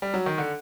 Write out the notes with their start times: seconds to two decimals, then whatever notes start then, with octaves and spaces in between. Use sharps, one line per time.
0.02 G3
0.14 F#3
0.26 D#3
0.38 D3